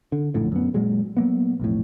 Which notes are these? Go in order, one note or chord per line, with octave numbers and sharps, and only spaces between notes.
D3
A#1 F#2 A2 D3
F#2 B3
A#2 F#3 G#3
F#3 A#3 B3
B1 F2 A2